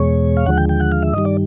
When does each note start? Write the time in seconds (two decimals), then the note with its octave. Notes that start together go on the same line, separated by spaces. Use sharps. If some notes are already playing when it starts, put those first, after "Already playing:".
Already playing: E2 B2 G#3 C#5
0.37 F5
0.46 D#2 D3 F3 G#3 F#5
0.57 G5
0.69 G5
0.80 F#5
0.92 F5
1.03 E5
1.13 G2 D#3 G3 D#5
1.25 D5